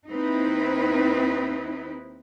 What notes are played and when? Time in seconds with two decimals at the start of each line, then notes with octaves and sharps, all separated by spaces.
0.11 D#2 C4 D#4 E4 B4